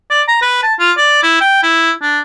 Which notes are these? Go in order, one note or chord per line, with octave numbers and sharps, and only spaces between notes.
D5
A#5
B4
A5
F4
D5
E4
G5
E4
D4